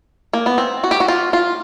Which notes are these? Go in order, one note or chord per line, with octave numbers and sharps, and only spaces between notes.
A#3
B3
C4
F#4
G4
F#4
F4
F4